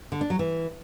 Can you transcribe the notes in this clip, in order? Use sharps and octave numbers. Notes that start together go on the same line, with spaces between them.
D3
D4
F#3
E3